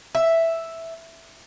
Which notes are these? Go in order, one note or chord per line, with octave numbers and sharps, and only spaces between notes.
E5